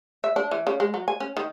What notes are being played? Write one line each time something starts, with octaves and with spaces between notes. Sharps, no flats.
E5
D4
E3
C#3
G#3
F#3
G#5
C#4
D#3